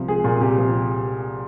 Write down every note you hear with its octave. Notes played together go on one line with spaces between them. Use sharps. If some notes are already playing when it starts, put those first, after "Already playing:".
Already playing: C2 F3
G#3 G#4
A#2
C2 G4
F3